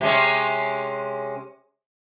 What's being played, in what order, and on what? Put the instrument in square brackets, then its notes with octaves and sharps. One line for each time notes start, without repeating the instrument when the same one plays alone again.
[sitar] C3 G#3 C#4